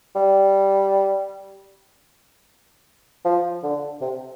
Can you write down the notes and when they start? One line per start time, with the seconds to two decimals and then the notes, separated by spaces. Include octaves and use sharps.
0.15 G3
3.25 F3
3.63 D3
4.01 C3